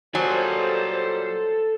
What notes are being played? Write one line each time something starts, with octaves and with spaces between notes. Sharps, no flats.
A#2 F#3 G3 A4 C5 G#5